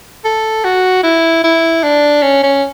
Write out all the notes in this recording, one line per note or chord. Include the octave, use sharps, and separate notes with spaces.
A4
F#4
E4
E4
D4
C#4
C#4